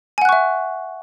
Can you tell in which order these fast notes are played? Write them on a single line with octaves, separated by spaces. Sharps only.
G#5 F#5 F#6 C#6 E5